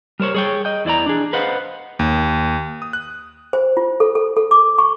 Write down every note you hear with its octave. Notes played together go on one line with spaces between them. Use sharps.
G3 A#4 C5 C#5
G#4 C#5 G5
D#5 G5
E2 E4 D5 G5 A#5
D4 G#4
B4 C5 D#5 F5 F#5
D#2
D#6
F#6
C5
F4
A4
A4
A4
D6
C#6